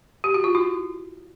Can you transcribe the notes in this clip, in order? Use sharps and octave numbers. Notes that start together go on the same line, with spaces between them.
G4
F#4
F4
E4 F#4